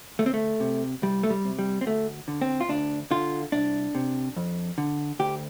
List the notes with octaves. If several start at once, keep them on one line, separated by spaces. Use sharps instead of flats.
D2 A3
C4
A3
C3
C2 G3
A3
G3
C3
G3
C4
D2 A3
D3
C4
F4
D2 D4
D3 F4
C2 D4
C3
F2
D3
D2 G4